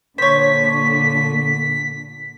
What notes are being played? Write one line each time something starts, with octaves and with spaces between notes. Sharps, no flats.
A#2 D3 A#3 C5 C#5 B6